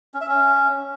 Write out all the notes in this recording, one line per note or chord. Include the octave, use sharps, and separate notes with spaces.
C#4
E5
C#4